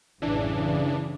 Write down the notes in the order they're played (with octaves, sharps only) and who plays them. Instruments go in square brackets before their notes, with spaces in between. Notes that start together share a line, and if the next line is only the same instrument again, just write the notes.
[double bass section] A1 F#2 C#3 [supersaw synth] E3 D4